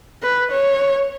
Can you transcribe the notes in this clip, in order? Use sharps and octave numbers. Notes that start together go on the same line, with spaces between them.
B4
C#5